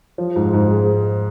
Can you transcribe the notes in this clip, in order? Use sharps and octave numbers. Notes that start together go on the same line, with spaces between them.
F3
G#2
G#2
G#3